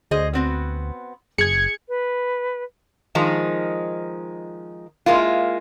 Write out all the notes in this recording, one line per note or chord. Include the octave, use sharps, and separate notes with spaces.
D2 G#4 C5 D#5
B3 C4 F#4
F#1 G#4 G#6 C#7
B4
D#3 F3 G#3 D#4
G#3 A#3 E4 F4